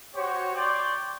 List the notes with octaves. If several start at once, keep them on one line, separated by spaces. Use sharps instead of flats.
F#4 G4 C5 C#5
C#5 D5 G5 C6 D6